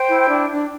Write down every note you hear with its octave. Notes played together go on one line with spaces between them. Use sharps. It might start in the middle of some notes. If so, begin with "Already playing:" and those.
Already playing: C5 G5
E4
D4
D4